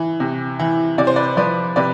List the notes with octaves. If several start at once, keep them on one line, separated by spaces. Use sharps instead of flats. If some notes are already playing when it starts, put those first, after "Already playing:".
Already playing: E3
C3
E3
C3 D5
C5
B4 D5
F3 B4 D5
C3 B4 D5